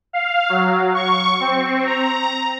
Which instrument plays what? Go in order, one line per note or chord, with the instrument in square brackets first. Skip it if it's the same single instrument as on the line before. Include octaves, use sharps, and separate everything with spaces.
[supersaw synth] F5
F#3
C#6
C4
A#5